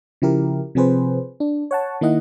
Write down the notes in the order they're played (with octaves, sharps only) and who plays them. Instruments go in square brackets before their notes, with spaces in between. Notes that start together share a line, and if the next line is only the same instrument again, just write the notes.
[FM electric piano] C#3 F3 E4 G4 A#4
C3 F3 C4 G#4 B4 C5
D4
C#5 F#5 A5
D#3 A#3 E4 D#5 F#5